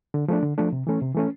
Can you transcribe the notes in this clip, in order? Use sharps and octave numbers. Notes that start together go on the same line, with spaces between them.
D3
F3 A3 D4
D3
F3 A3 D4
C3
E3 A3 C#4
C3
E3 A3 C#4